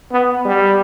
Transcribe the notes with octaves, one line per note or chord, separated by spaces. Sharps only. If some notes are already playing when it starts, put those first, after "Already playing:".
B3
G3